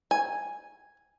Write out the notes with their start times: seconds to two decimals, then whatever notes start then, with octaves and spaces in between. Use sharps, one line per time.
0.11 G#5